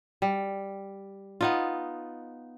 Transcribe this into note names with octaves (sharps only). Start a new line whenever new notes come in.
G3
B3 D#4 F4